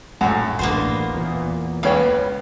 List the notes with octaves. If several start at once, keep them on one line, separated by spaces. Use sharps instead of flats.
A#1 F#2 A2 G#3 F#5
A1 D2 D3 A#3 B3 C5
E2 A#2
C#2 C#3 B3 C#5 F5 G5